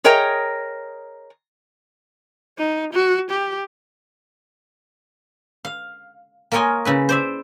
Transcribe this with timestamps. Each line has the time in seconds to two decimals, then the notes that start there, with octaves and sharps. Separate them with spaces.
0.04 G#4 A#4 C#5 D#5 G5 A#5
2.58 D#4
2.93 F#4
3.30 G4
5.65 F5
6.52 A#3 F4 A#4 C#5 D#5 G#5
6.85 C#3 E4 B4
7.09 C5 D5 E5